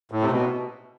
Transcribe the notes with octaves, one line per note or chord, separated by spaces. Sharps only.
A2
C3
B2